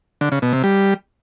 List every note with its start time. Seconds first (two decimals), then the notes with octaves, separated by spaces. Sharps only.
0.21 D3
0.32 C#3
0.42 B2
0.53 C3
0.64 G3